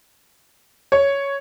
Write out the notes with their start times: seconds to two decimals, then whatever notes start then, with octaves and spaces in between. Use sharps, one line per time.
0.92 C#5